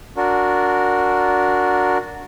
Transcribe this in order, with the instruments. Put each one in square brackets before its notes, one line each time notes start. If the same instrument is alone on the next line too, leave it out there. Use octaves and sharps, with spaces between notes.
[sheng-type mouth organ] D4 F#4 A#4